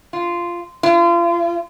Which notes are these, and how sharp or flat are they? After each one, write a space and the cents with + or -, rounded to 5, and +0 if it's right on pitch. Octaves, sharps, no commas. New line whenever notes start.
F4 -10
F4 -35